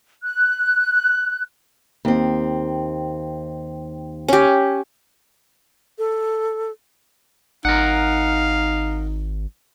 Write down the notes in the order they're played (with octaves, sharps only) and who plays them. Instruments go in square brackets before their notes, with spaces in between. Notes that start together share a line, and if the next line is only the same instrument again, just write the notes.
[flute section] F#6
[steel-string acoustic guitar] D#2 C4
[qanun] C#4 G4
[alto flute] A4
[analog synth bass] G#1 [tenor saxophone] D#4 [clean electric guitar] A#4 F#5 [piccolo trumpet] F5